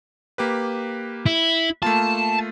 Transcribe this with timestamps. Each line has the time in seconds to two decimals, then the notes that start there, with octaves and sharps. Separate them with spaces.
0.38 A#3 G4 B4
1.26 E4
1.82 A3 A#3 F4 A5